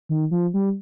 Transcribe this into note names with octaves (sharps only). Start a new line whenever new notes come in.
D#3
F3
G3